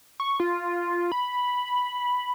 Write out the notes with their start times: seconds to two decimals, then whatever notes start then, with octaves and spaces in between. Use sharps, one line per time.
0.20 C#6
0.40 F4
1.12 B5